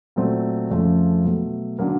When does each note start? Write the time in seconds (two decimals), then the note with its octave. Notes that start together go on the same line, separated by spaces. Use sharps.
0.16 A#2 F#3 A3 C4
0.71 F2 C#3 F3 A3
1.25 B2 F#3 A3
1.79 D3 F#3 A#3